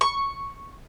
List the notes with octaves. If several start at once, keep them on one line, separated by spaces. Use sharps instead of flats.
C#6